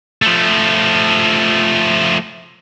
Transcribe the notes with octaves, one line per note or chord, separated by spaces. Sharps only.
F3 A3